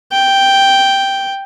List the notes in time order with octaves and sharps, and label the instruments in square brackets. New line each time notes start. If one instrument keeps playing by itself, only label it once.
[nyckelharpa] G5